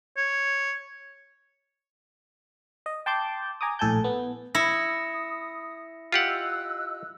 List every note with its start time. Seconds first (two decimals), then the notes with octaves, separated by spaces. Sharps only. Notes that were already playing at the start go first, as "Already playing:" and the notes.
0.17 C#5
2.86 D#5
3.06 G5 A5 C6 D6 G6
3.61 G#5 A#5 D6 D#6
3.79 A#1 A2 A4 G#5 A5 G6
4.04 B3
4.55 E4 D#6 A#6 C#7
6.12 F4 G4 D#5 F#5 E6 F#6